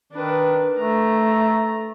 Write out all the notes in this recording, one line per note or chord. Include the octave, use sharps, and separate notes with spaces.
D#3 D4 B4
A3 A#5